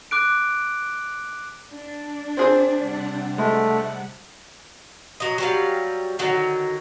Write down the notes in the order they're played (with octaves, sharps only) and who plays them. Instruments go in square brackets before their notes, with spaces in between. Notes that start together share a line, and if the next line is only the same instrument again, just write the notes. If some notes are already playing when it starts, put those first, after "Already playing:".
[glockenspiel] D6 F#6 D7
[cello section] D4
[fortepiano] C4 G#4 C5
[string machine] C3 G3 F#5
[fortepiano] G#3 [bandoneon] A3
[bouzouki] F#3 D#5
F#3 G3 F5
D3 D#3 F#3